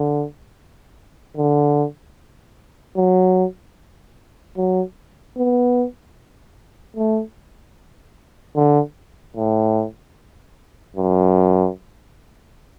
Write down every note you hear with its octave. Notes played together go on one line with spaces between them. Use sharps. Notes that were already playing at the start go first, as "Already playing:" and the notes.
Already playing: D3
D3
F#3
F#3
B3
A3
D3
A2
F#2